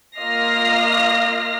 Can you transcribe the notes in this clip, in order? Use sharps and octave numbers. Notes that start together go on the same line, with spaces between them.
A#3 F4 D#5 F6 A#6 C7